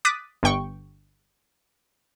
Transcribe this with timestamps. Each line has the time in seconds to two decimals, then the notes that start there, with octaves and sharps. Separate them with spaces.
0.05 D6 D#6 F#6 A6 B6 D#7
0.43 G1 G2 G5 C#6